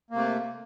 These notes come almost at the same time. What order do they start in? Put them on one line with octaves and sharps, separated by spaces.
A#3 C3 A3